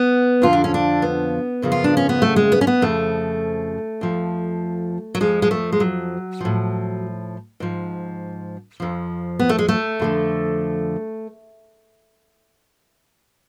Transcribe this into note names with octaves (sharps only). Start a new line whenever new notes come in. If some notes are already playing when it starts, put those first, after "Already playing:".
Already playing: B3
F2 D3 F3 F4
D4
C#4
D4
B3
F#2 C#3 F3
F4
D4
C#4
B3
A3
G#3
B3
C#4
B3
F2 C#3 F3 A3
F2 F3
F#3
F2 F3 G#3
G#3
A3
G#3
F#3
A2 F3
G#2 F3
F2 F3
B3
A3
G#3
A3
F2 D3 F3